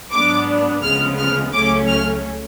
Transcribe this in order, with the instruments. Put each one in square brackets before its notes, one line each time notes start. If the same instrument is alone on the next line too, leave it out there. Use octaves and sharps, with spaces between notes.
[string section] G#2 F#3 B3 D4 D6
D2 C#3 F3 G#3 B3 F6
F6
C#2 C#3 F#3 A3 C#4 D6
F6